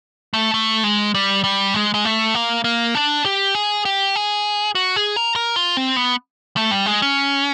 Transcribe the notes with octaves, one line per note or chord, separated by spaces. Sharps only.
A3
A3
G#3
G3
G3
G#3
G#3
A3
A#3
A#3
D4
G4
G#4
G4
G#4
F#4
G#4
A#4
A#4
F4
C4
B3
A3
G3
G#3
C#4